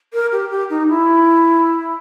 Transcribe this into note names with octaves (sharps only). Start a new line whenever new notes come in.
A#4
G4
G4
D#4
E4